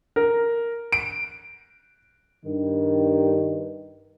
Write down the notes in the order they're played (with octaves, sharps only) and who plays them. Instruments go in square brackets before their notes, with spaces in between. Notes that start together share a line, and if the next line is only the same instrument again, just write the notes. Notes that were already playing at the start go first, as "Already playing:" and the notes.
[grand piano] A#4
D7
[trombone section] G2 D#3